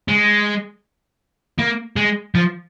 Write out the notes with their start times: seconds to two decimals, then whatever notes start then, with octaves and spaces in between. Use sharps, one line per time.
0.08 G#3
1.59 A#3
1.96 G#3
2.35 F3